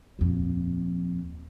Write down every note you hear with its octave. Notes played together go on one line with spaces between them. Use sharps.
D#1 F2